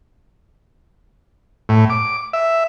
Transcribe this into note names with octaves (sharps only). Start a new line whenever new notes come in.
A2
D6
E5